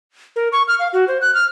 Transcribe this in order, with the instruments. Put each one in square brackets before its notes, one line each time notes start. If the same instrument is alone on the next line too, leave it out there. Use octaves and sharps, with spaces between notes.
[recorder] A#4
C#6
F6
F5
F#4
C5
F#6
F6